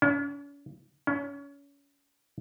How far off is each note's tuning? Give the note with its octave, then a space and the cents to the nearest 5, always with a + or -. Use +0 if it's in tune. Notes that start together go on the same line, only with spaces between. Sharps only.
C#4 +45
C#4 +30